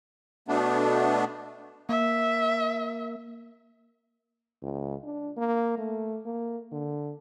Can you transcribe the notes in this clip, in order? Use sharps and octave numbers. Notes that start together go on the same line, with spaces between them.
B2 A3 B3 D4
A#3 E5
C#2
D4
A#3
A3
A#3
D3